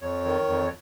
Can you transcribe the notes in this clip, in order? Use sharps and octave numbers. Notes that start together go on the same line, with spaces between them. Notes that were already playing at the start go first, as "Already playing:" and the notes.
F2 C#5
D#3
F2